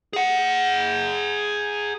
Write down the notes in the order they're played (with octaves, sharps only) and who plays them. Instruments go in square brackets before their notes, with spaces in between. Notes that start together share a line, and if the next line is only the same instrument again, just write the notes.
[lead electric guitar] G#4 F#5